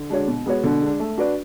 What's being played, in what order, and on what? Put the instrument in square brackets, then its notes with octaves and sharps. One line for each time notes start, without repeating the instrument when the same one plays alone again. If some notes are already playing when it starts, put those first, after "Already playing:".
Already playing: [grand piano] D3
[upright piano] G#3 D4 F#4 C#5
B2
G#3 B3 F#4 C#5
[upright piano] B2 [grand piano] D3
[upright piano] G#3 D4
A3
D4 F#4 B4 D5